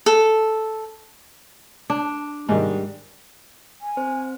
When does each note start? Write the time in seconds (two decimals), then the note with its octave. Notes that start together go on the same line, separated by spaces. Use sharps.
0.06 A4
1.90 D4
2.49 G#2 D#3 G3
3.81 G#5
3.97 C4 C5